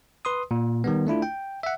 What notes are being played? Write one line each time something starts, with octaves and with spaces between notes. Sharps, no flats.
B4 C6 D#6
A#2
D#3 G3 B3
A3 D4 E4 F4
G5
E5 F#5